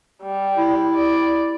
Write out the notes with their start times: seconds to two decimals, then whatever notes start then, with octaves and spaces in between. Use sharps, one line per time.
0.22 G3
0.58 E4
0.95 D5